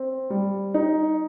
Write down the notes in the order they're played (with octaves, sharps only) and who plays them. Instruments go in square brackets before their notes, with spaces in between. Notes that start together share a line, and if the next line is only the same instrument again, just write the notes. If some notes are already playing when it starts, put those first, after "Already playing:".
Already playing: [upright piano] C4
G3
D#4